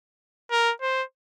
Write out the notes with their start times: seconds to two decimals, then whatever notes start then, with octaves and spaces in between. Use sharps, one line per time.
0.51 A#4
0.82 C5